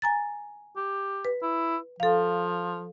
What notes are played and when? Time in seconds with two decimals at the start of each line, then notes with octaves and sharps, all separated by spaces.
0.02 G#5 A#5 A6
0.77 G4
1.25 B4
1.42 E4
2.00 F3 A4 F5